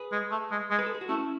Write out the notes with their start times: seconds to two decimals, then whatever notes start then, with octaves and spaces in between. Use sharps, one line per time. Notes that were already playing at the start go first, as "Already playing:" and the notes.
Already playing: G#4 B4
0.12 G#3
0.32 A3
0.51 G#3
0.71 G#3
0.79 B4
0.86 A4
0.95 G#4
1.01 F#4
1.09 A3 C#4 E4